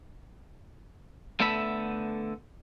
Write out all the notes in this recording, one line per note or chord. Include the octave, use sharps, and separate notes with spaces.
D3 A3 B3 A4 E5 B5